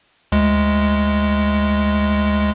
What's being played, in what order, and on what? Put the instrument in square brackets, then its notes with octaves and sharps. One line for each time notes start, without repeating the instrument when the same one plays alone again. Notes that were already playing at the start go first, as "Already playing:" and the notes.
[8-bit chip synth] D2 G#3